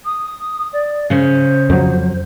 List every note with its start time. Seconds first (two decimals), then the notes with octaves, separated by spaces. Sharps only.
0.05 D#6
0.73 D5
1.10 C#3 C#4 C5
1.70 F2 F#3